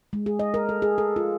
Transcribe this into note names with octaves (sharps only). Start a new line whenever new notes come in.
G#3
G#4
D#5
A#4
A4
G#4
A4
F4